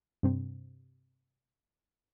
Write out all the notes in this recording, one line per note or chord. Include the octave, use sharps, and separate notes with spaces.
G2 C3 C4